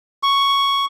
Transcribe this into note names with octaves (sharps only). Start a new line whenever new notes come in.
C#6